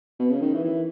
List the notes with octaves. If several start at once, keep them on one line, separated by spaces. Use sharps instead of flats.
B2
C#3
D#3
E3
E3